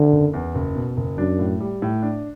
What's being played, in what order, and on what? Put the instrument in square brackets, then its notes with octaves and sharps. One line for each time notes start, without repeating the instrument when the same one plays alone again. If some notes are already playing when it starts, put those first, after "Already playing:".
Already playing: [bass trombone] D3
[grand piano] F#1
E2
F#1
B2
F#1
[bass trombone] F#2 [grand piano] D4
[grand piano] A2
G3
A2
D4